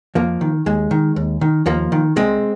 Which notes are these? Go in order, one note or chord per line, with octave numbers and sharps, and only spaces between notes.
F2 F3 A#3
D#3
D#2 G#3
D#3
D#2
D#3
D#2 F3 A#3
D#3
C2 G#3 C4